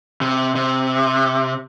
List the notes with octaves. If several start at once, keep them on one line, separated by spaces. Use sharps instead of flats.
C3
C3